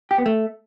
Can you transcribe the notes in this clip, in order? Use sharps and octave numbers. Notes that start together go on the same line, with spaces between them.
G4
B3
A3